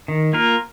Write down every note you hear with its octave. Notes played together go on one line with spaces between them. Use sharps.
D#3
A#3 F4 A#4